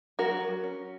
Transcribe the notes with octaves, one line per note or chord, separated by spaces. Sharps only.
F#3 F#4 A#4
F#3
C#4